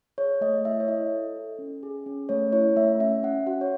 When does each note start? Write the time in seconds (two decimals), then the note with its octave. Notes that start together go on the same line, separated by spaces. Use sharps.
0.18 G#4 C#5
0.41 A3 D#5
0.65 E4 E5
0.80 C#5
0.88 E4 D#5
1.12 A4
1.36 A4
1.59 C#4
1.83 G#4
2.06 C#4
2.29 A3 C#5
2.52 E4 C#5
2.76 A3 E5
3.00 C#4 E5
3.23 C#4 F#5
3.47 F#4 F#5
3.61 C#5